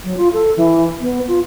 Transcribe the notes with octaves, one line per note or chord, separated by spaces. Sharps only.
F#3
F4
A4
E3
B3
F4